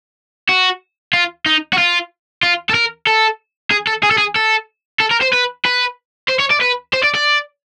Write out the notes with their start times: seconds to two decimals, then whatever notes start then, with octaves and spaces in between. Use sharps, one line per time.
0.49 F#4
1.13 F4
1.46 D#4
1.73 F#4
1.78 F4
2.43 F4
2.70 A4
2.75 A#4
3.07 A4
3.71 G#4
3.87 A4
4.03 G#4
4.11 A4
4.18 G#4
4.36 A4
5.00 A4
5.11 A#4
5.21 C5
5.33 B4
5.65 B4
6.28 C5
6.39 C#5
6.50 D5
6.61 B4
6.93 C5
7.04 D5
7.15 D5